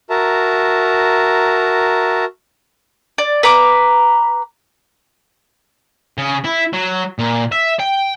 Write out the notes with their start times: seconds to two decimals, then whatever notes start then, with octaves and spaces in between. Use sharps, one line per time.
0.10 F#4 A#4 E5 A5 A#5
3.18 D5
3.43 B4 A#5 D6
6.18 C#3
6.45 E4
6.73 F#3
7.19 A#2
7.52 E5
7.80 G5